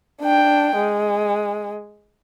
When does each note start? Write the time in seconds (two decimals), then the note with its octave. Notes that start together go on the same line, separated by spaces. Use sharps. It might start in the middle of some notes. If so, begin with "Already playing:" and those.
0.21 D4 G5
0.76 G#3